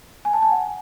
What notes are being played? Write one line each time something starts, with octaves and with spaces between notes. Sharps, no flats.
G#5
A5
G#5
F#5